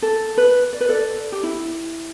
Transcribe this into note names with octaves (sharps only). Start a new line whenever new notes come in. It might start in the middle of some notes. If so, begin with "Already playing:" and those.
A4
B4
D5
B4
A4 D5
G4
E4